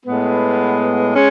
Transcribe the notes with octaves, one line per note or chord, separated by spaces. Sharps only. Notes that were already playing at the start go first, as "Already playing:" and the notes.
A2 G#3 B3
G#3 C#4